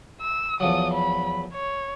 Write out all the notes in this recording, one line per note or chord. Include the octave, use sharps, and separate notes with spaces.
E6
E2 F3 F#3 D#6
B5
C#5